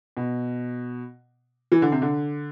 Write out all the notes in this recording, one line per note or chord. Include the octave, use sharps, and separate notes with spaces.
B2
E3
D3
C3
D3